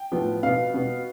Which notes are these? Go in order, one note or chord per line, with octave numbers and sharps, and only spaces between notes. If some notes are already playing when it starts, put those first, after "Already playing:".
Already playing: G5
A2 F3 B3
B2 B3 F5
B2 B3